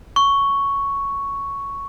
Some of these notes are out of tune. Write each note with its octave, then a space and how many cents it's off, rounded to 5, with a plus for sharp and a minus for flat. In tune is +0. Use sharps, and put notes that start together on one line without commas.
C#6 +5